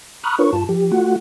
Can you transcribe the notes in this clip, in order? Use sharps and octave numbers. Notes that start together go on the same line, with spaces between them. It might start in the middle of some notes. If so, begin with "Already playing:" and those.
A#5 B5 C#6 D#6 F6 F#6
D4 F4 A#4 B4 C#5 C#6
G2 F4 A5
F3 G4
A3 F4 F#4 F#5